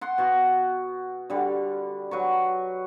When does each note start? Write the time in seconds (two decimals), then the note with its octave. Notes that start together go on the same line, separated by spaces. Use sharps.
0.01 F#5 C6
0.18 B2 F#4
1.30 D3 G3
2.11 F#3 B4 C#6